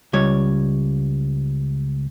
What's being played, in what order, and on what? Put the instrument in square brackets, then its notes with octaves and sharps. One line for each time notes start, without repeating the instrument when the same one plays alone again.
[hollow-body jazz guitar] C#2 G3 C#5